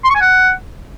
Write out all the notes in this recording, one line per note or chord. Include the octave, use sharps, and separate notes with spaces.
C6
C#6
G#5
F#5